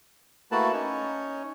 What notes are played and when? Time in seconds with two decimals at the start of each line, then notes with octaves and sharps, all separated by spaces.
0.52 A3 A#3 E4 F#4 B4 A5
0.72 C#4 D#4 C#5